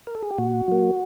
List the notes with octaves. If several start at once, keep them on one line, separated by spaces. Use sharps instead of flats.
A#4
A4
G#4
G4
A#2 F#4
F#3 A#3